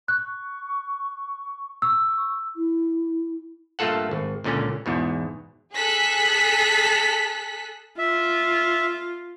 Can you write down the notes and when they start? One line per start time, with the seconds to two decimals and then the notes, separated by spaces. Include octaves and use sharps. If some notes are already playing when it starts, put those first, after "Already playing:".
0.08 C#6 F#6
1.82 C#6 E6
2.55 E4
3.79 G2 A3 A#3 F4 A4 F#5
4.11 G#1
4.44 C#2 A#2 D3 C#4
4.86 E2 G#2 B2
5.75 G#4 A4 F#6 B6
7.98 F4 E5